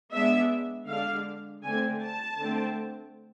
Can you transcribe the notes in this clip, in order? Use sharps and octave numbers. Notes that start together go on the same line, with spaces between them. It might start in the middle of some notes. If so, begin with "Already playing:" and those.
G#3 B3 D4 E5
D3 G#3 D4 F5
D3 A3 C4 G#5
A5
D3 A3 C4